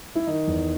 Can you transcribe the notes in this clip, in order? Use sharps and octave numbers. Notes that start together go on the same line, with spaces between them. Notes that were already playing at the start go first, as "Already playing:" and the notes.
E4
D#3 D#4
E2